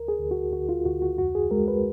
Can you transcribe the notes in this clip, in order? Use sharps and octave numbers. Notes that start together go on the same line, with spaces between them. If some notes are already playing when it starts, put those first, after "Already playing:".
Already playing: D2 A#4
G#4
D2
F#4
D2 F#4
F4
D2 F#4
F#4
F2 F#4
G#4
G#3 A#4
B4